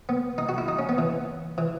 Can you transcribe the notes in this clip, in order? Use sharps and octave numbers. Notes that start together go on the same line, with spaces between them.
B3
D#4
F#4
E4
D#4
C#4
B3
E3
E3